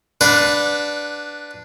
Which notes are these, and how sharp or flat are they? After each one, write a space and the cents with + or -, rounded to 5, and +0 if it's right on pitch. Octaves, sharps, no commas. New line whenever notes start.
D4 +0 B4 +0 F#5 -40